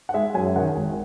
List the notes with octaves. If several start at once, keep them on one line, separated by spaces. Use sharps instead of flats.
F#5
G#3 E5
F#2 G#5
D#3 F#5
G#1